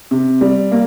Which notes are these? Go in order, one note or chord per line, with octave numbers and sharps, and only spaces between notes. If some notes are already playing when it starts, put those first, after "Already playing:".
C3
G3
A#3